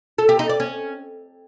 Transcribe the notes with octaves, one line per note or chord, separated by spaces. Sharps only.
A4
G4
D#4
D5
C#4